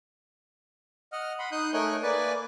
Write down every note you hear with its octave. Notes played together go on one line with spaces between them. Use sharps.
D#5 F#5 F6
F#5 B5 C6
D#4 D#6 F#6 G6
A3 D#4 A#4 C#5 G#5 F#6
A#3 B4 D5 G#5